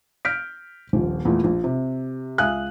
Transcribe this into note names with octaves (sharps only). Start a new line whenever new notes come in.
F6 G6 B6 D7
D#1 A#1
E2 A#2 A3
A#1
C3
C#2 E5 F5 G#5 D#6 F#6